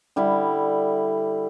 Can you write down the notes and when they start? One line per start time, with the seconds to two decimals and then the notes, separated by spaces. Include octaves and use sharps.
0.16 D3 G3 E4